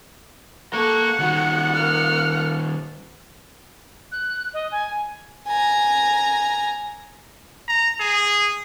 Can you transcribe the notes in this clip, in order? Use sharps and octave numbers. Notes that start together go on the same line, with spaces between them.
A#3 A4 A#4 F#5 C#6
D#3 G3 F#4
A#3 F6
F#6
D#5
G#5
G#5 A#5
A#5
G#4